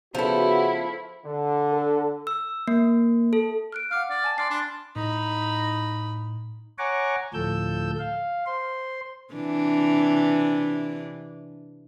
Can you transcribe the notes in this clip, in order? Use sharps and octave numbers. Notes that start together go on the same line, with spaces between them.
C#3 F3 A3 B3 E4 F#4
D3
A4
E6
A#3
A4
F6 F#6 D7
F5 F#5 D6 F6
D5
G#5 A5
D5 C6 F6 C7
D4 B5 C6
A2 D#4 B5
C#5 F#5 G#5 A#5 C#6 D6
D2 A2 F3 A4 E6 G6
F5
C5 C6
C3 E3 D4